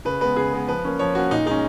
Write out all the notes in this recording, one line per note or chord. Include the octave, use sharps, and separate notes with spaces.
C#3 B4
G#3 B3 B4
C#3 G#4
G#3 B3
F3 B4
A#3 C#4
F3 C#5
A#3 C#4 F#4
A#2 D#4
G#3 C#4 D#4